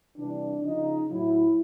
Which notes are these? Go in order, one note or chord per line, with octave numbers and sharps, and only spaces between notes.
C3 E3 G3 D4
C#3 F3 D#4
A2 F#3 E4